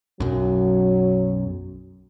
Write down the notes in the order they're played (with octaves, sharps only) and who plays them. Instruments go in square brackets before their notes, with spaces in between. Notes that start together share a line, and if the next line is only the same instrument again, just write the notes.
[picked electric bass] B1 F#2 [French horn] F#3